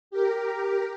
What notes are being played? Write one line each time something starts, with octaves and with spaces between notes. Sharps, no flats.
G4 A#4